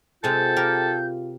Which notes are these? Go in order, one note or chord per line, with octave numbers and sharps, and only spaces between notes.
C3 G#3 F4 A4 G6
G4 A#4